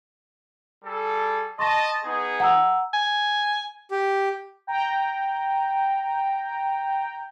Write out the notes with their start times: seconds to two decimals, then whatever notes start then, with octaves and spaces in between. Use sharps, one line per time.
0.85 G3 G#4 A4
1.59 D#5 A5 C6 C#6 A#6
2.04 B3 D#4 G#4
2.40 F#5 A#5 E6
2.94 G#5
3.91 G4
4.67 G5 A#5